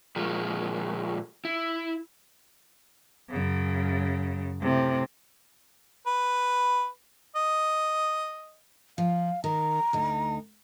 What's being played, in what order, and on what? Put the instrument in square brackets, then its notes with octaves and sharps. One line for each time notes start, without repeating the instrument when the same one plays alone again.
[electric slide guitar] A#2 F3 G#3 F4
E4
[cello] F#2 C#3
A2 C3
[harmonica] B4
D#5
[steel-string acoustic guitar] F3 [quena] F5
[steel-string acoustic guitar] D#3 [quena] A#5
[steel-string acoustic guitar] D2 D#4